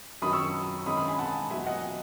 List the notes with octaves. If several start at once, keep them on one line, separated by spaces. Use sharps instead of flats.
F#2 D#3 F#3 B5 D#6
C#6 E6
G#2 D#3 G#3 C#4 B5 D#6
B5 D#6
G#5 B5
F#5 A5
E2 B2 F#3 E5 G#5
D#5 F#5